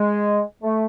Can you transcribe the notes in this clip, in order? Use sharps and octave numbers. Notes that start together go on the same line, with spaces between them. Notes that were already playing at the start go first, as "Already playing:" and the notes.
Already playing: G#3
A3